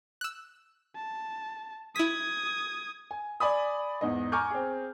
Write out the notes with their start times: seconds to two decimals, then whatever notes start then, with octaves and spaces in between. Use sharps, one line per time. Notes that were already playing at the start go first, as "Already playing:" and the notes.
0.21 E6 F#6
0.96 A5
1.96 E4 D#6 G#6 B6
3.11 G#5
3.40 D5 G#5 B5 D#6
4.01 E2 G#2 D#5
4.32 G#5 A#5 C#6 D6 F6 G6
4.50 C4 G#4